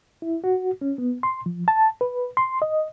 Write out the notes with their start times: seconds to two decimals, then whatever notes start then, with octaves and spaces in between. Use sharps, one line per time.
0.22 E4
0.44 F#4
0.81 C#4
0.98 B3
1.23 C6
1.46 F3
1.68 A5
2.01 B4
2.37 C6
2.62 D#5